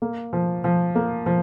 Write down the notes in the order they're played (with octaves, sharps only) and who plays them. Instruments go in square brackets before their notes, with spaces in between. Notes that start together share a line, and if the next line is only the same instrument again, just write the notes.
[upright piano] A#3
F3
F3
A#3
F3